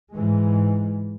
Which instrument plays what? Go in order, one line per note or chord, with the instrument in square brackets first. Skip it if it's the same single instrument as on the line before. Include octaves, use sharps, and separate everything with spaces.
[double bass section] G#2 E3 G#3